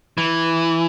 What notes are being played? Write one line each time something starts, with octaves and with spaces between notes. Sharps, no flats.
E3